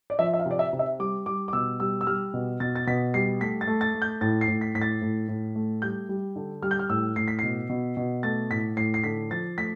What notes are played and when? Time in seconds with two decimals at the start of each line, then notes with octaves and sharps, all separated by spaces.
0.10 D5
0.19 F3 E5
0.34 E5
0.39 F5
0.46 C3 D5
0.59 E5
0.73 C3
0.79 E5
0.99 G3 D6
1.26 G3 D6
1.48 D6
1.53 B2 E6
1.80 G3 E6
2.01 E6
2.07 G3 F6
2.34 B2
2.60 B2 A6
2.75 A6
2.87 B2 B6
3.14 G3 C7
3.41 A3 B6
3.61 A6
3.67 A3
3.81 A6
3.95 A3
4.02 G6
4.21 A2 A6
4.41 C7
4.48 A2
4.61 B6
4.75 A2 B6
4.81 A6
5.02 A2
5.28 A2
5.55 A3
5.82 G3 G6
6.09 G3
6.36 D3
6.62 G3 F6
6.71 G6
6.79 F6
6.89 A2 E6
7.16 A2 C7
7.28 B6
7.39 B2 C7
7.70 B2
7.97 B2
8.23 A3 A6
8.50 A2 B6
8.77 A2 C7
8.94 C7
9.04 D3 B6
9.31 F3 A6
9.58 A3 B6